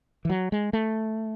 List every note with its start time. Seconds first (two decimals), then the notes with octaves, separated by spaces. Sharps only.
0.25 E3
0.29 F#3
0.52 G#3
0.73 A3